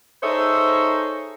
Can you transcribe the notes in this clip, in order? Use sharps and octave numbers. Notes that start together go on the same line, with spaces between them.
D#4 G#4 A4 C5 C#5 E5